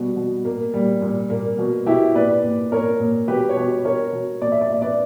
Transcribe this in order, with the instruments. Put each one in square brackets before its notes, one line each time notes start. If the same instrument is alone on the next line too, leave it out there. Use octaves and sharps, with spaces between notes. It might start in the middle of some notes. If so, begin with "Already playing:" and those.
Already playing: [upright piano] B2 G3 B3
B2
A#2 A#3
A#2 G3
A#2
A#2 A#3
B2
B2 E4 G4
A#2 B4 D5
A#2
A#2 A#4 C#5
A#2
B2 G4 B4
C#5
B2 G4 B4
B2 A#4 C#5
B2
A#2 D5
E5
D5
A#2 E5
B4 D5